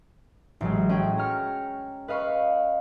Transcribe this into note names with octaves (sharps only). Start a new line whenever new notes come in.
A1 F#3 G#3
A3 C#4 F#4 G#4 G5
A#5 C#6 F6 C#7
B4 D#5 F5 B5 C#6